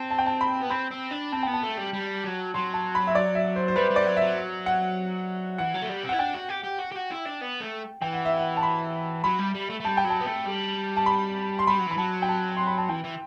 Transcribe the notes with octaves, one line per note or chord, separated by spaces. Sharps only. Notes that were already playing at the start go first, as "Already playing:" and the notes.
Already playing: C4 A5
A5
G5
A5
B5
B3
C4 B5
C4
D4
C4 A5
B3 G5
A5
A3
G3
G3
F#3
F#3 C6
A5
B5
E5
D5
E5
C5
C5
G3 B4
G3
D5
F#3
F#3 E5
F#5
E3 F#5
F#3
A3
G3
C4
E4 F#5
D4 G5
F#4
G4
G4
F#4
G4
F#4
E4
D4
B3
A3
E3 G5
F#5
E5
F#5
A5
B5
F#3 B5
G3
G3
A3
A3
G3 A5
G5
F#3
A5
B3
A3
G3
A5
B5
C6
G3 B5
F#3
E3 B5
F#3 A5
G5
A5
C6
B5
A5
E3 G5
E3